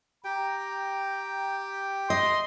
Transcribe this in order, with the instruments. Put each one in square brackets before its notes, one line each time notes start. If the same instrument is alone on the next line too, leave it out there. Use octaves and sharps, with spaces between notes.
[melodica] G4 G5 [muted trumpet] A#5
[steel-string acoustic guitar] D#5 [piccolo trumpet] C6